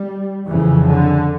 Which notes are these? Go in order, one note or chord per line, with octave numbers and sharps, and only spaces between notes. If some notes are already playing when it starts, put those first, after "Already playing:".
Already playing: G3
F2 C#3 E3
D3